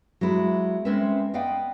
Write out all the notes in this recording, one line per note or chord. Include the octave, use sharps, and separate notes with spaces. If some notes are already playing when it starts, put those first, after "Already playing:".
F#3 G#3 B3 E4
G#3 C4 C#4 A#4 B4 E5
B3 D5 D#5 F5 G5